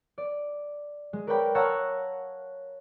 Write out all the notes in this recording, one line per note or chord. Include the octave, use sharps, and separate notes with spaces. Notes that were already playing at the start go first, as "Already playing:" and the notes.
D5
G#3
A#4 B4 C#5 D5 G5 B5
C#5 F5 F#5 A5 A#5 E6